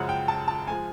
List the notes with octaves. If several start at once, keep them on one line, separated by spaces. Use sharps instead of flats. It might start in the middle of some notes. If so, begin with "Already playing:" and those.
Already playing: F#2 C#3 F3 G#3 F#5
G5
A5
A5
F3 G#3 G#5